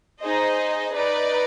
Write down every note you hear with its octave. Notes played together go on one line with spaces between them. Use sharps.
D#4 G#4 C5 D#5
D#4 B4 D5